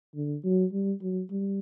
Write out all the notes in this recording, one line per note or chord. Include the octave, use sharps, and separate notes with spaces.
D3
F#3
G3
F#3
G3